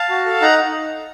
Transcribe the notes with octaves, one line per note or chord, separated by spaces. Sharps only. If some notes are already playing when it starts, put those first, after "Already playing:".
Already playing: F5 A5
F#4
A4
D#4 F#5 A#5